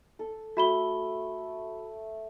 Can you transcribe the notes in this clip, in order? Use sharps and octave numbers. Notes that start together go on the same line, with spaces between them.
A4
A3 F#4 B5 G7